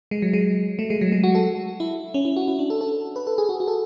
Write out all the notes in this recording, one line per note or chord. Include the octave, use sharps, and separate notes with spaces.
G#3
F#3
G#3
A3
G#3
F#3
G#3
F#4
A4
E4
C#4
E4
F#4
E4
D4
A4
A4
B4
A4
G#4
F#4
F#4
A4